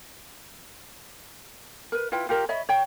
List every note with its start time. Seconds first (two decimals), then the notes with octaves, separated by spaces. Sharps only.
1.92 A#4 B4
2.12 E4 F4 B4 G5
2.29 F4 G4 A#4
2.49 C#5 D#5 E5 B5
2.69 C#5 G5